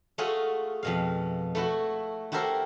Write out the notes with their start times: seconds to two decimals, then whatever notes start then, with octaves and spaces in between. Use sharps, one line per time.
0.18 A3 F4 F#4 G#4 A4 G#5
0.83 F2 B2 F5
1.55 A3 E4 F#4
2.32 E4 F#4 G4 A4 A#4 C5